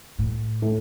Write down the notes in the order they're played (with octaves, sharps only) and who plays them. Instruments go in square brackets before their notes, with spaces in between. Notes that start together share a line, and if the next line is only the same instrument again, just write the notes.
[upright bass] A2
[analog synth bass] A2